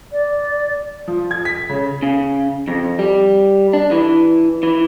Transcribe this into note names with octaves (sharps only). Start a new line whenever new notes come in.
D5
F3
G#6
B6
C#3
C#3
F2
G3
D4
E3
E3